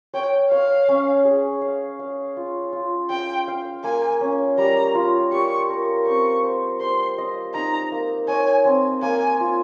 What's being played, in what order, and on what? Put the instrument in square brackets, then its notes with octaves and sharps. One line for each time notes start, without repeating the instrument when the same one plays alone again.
[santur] C#5 [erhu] G5
[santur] C#5 [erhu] F5
[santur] C#4
G#4
F5
F5
F4
F4
[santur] F5 [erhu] G5
[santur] F5
[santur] A#3 [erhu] G#5
[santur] C#4
[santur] G3 [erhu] A#5
[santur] F4
[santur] G4 [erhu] C#6
[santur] A#4
[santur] C4 [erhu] C#6
[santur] C5
[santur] C5 [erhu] C6
[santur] D#5
[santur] D#4 [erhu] A#5
[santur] A#3
[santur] C#5 [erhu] G#5
[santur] C4
[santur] A#3 [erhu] G#5
[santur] F4